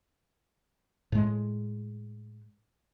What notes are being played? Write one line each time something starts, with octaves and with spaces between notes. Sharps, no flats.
A2 G#3